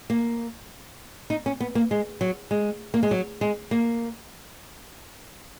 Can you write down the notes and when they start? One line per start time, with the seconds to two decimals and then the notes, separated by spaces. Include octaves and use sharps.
0.10 A#3
1.30 D#4
1.46 C#4
1.61 B3
1.75 A#3
1.91 G#3
2.21 F#3
2.51 G#3
2.94 A#3
3.03 G#3
3.11 F#3
3.41 G#3
3.71 A#3